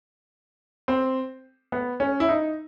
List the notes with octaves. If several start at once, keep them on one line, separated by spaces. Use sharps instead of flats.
C4
B3
C#4
E4
D#4